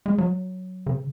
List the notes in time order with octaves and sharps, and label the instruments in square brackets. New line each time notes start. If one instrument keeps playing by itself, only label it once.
[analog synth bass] G#3
F#3
C#3